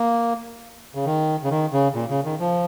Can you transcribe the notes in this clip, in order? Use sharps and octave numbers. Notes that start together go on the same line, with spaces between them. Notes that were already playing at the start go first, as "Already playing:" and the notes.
Already playing: A#3
C#3
D#3
C#3
D#3
C#3
A#2
C#3
D#3
F3